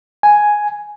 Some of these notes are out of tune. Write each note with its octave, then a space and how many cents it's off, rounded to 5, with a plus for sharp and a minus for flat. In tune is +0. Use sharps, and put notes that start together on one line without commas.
G#5 +5